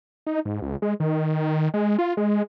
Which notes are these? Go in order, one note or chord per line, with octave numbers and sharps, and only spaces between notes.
D#4
G#2
C#2
G#3
D#3
G#3
F4
G#3